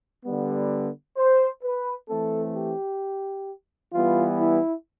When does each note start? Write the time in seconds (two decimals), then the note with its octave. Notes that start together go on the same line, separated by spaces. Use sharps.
0.24 D3 G3 B3
1.17 C5
1.63 B4
2.09 E3 A3 C4 A4
2.55 G4
3.93 E3 G3 B3 F4
4.40 E4